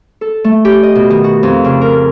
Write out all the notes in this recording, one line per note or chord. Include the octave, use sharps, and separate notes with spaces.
A4
A3
G4
D#5
B2
D#3
F#4
F2
C#3
A#4